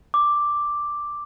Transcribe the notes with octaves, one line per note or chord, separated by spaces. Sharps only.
D6